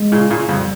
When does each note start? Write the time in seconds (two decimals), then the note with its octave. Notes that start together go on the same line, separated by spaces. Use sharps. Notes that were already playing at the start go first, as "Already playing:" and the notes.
Already playing: G#3
0.12 A#2 C#3
0.30 A#2 C#3
0.49 F2 G3